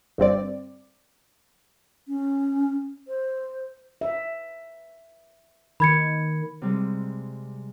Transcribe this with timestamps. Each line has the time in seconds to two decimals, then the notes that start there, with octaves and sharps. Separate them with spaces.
0.18 G1 G2 C4 D5
2.08 C#4
3.08 C5
4.01 E5
5.80 D#3 B5 G#6 C#7
6.62 C3 G3 G#3